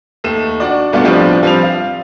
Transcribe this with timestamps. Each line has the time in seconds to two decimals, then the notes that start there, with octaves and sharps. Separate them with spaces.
0.24 D#2 A3 E7
0.60 D4 F#4 D5
0.92 G2 B2 A3 B3 D4 F4
1.04 A2 F3 G3 C4 D4 G4
1.43 F3 G3 C4 F7
1.63 F5